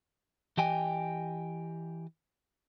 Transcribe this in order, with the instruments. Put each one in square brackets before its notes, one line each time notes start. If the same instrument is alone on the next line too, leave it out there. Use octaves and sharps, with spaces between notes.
[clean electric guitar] E3 G4 D#5 G5 G#5